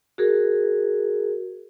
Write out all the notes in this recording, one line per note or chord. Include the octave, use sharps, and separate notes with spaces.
F#4 G#4 A#4